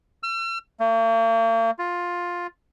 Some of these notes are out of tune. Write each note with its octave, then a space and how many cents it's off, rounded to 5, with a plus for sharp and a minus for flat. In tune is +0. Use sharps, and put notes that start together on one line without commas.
E6 +45
A#3 -45
F4 +10